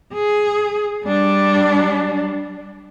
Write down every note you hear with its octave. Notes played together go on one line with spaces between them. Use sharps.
G#4
G3 D4